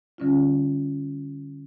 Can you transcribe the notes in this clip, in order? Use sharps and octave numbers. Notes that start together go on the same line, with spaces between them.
D3 G3 C#4 F4